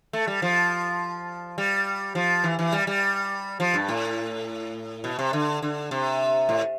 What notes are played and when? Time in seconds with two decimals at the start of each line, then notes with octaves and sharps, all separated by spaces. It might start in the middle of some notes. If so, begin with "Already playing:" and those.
0.13 A3
0.27 G3
0.42 F3
1.58 G3
2.15 F3
2.44 E3
2.59 E3
2.73 G3
2.87 G3
3.60 F3
3.74 G2
3.89 A2
5.04 B2
5.19 C3
5.33 D3
5.62 D3
5.91 C3
6.49 A2